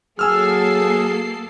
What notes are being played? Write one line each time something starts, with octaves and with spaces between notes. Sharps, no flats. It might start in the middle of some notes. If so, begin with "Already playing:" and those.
F#3 A#3 G#4 A4 G#5 E6 F6 C7